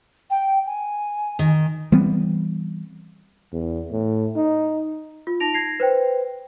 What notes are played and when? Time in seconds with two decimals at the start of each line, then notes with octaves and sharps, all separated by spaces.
0.30 G5
0.66 G#5
1.39 D#3
1.92 E3 G3 B3 C4
3.53 E2
3.92 A2
4.36 D#4
5.27 F4
5.40 D#4 A5 A#6 D7 F7
5.54 G#6 A#6 C7
5.80 B4 C5 G5